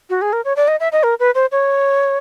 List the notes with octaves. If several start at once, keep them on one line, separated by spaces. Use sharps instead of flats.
F#4
G#4
A#4
C#5
D5
D#5
E5
D#5
A#4
B4
C5
C#5